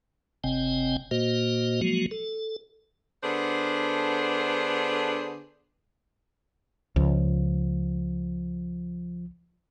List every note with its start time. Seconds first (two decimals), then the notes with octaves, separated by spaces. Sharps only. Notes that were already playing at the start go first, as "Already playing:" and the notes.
0.44 F#1 C3 C4 D#5 G5 G#5
1.11 A#2 A#3 F#4 C5 D#5
1.81 F3 F#3 G#3 A#3 F#4
2.11 A4
3.23 D3 B3 D4 G#4 A4 C5
6.96 C#2 F3